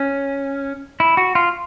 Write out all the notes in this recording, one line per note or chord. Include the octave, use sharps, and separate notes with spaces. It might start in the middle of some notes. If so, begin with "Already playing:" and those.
Already playing: C#4
E4
F#4
F4